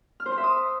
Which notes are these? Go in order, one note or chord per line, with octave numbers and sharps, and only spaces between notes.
F6
C5
C6
E5
D#6